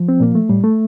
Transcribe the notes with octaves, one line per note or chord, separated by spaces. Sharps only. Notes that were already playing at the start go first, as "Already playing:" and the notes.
Already playing: F3
C4
A#2 A#3
A3
A2 G3
A3